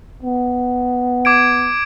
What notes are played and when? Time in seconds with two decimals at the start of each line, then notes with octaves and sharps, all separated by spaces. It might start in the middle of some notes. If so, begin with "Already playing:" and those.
0.23 B3
1.25 D6 G#6 D7